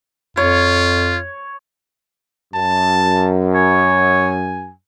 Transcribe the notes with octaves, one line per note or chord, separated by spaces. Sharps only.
F2 F4 C#5
F#2 A5
C#5 G#5